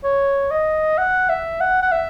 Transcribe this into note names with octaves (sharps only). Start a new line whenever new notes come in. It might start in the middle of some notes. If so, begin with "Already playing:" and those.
C#5
D#5
F#5
E5
F#5
F#5
E5